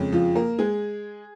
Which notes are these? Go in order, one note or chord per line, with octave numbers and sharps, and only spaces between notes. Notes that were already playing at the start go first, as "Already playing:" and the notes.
Already playing: F2 C#3 G#3
F3 F4
A#3 A#4
G#3 G#4